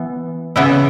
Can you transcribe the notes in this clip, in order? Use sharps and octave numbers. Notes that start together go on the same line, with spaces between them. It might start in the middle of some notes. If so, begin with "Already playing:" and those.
Already playing: E3 B3
C#3 E3 B3 E4